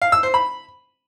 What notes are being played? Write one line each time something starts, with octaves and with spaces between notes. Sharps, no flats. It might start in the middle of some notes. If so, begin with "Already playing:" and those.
F5
E6
C5
B5